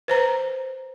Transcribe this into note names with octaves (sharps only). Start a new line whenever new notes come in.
B4 C5 A#5